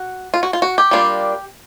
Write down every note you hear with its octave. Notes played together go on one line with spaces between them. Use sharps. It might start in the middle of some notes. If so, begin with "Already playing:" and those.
Already playing: F#4
F4
F#4
F4
F#4
G4
G3 A#3 D4 F4